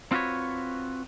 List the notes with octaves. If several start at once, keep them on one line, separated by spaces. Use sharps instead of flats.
C4 F4 F#4 B4 C#5